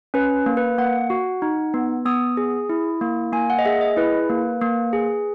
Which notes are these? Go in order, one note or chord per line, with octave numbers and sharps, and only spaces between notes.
C#4 B4
A#3
B4
A#3 F#5
F#4
D#4
B3
B3 D#6
G#4
E4
A#3
A#3 G#5
F#5
D#5
G#4 E5
D#5
E4 B4
A#3
A#3
G#4